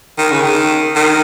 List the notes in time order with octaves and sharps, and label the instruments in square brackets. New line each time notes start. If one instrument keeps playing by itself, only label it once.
[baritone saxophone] D#3
C#3
D#3
D#3